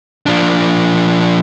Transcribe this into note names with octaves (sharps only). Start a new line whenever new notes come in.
F3 D4